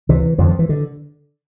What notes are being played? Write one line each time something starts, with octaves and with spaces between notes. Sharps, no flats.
D2 C3 E3
F2 D3 F3
F3
E3
D3